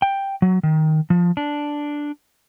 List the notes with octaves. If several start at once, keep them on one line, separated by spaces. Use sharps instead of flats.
G5
F#3
D#3
F3
D4